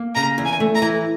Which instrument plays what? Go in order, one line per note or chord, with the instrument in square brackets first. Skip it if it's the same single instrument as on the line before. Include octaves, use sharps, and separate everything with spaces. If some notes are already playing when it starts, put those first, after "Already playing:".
Already playing: [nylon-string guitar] A#3
[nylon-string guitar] C#3 [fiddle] A#5
[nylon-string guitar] E2
[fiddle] G#5
[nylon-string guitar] A3
[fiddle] A#5
[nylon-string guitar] E3